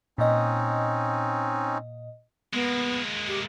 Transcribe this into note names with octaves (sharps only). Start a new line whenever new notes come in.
A#2 C4 C#4 D#4 D#5
G#3 A#3 B3
G4